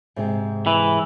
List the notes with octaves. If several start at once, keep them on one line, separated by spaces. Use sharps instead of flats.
G#2 C3 G#3
E3